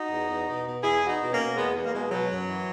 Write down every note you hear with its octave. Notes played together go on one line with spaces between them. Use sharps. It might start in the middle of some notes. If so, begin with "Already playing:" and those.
Already playing: D#4 F#4
E2
E2
B2
B2
E2 E4 G#4
E2
D#4 F#4
B2
A#3 C#4
B2
E2 G#3 B3
E2
A#3
B2 G#3
B2 F#3
F#2
E3